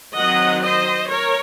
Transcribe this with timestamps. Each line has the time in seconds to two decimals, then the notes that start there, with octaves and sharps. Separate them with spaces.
0.16 D#3 F#3 C4 D#5 F#5
0.63 C5 D#5
1.10 A#4 C#5